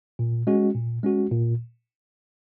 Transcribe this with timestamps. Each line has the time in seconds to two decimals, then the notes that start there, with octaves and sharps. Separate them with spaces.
0.19 A#2
0.47 G#3 C#4 F#4
0.75 A#2
1.03 G#3 C#4 F#4
1.31 A#2